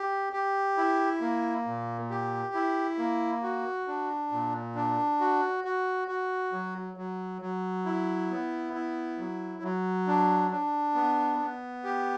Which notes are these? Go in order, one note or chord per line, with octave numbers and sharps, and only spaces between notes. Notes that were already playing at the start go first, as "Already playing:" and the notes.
Already playing: G4
G4
E4
A#3
A#2
G4
E4
A#3
F#4
D4
A#2
D4
F#4
F#4
F#4
F#3
F#3
F#3
E4
B3
E4
F#3
F#3
D4
D4
B3
B3
G4